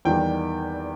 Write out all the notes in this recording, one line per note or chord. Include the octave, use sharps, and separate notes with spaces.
E2 D#3 G3 G5